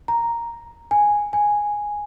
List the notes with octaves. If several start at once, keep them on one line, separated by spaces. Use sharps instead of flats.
A#5
G#5
G#5